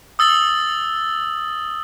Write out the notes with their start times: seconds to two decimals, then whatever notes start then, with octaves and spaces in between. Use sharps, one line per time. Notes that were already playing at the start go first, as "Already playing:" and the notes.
0.19 D#6 E6 A6 F#7 G7